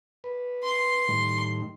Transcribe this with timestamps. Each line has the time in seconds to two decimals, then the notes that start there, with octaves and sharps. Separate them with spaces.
0.24 B4
0.64 C6
1.08 A2 D#3 G3